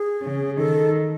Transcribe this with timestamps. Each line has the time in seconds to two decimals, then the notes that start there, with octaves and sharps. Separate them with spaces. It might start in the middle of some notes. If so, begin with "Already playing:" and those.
Already playing: G#4
0.22 C#3
0.57 D#3 A4